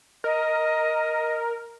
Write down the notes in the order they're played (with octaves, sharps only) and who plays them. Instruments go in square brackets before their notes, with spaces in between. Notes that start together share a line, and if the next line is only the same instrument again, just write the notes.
[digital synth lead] A#4 [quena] D#5